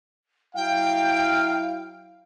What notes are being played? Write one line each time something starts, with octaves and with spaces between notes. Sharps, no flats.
F#3 E4 F5 G5